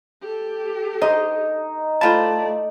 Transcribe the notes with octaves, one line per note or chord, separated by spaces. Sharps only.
G4 A4
D#4 C5 D#5
A3 E4 F4 C5 D5 A5